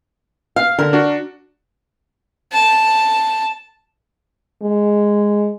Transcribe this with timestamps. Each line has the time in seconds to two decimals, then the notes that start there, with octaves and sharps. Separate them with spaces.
0.56 F5
0.79 D3 A#4
0.93 D4 F#4
2.53 A5
4.62 G#3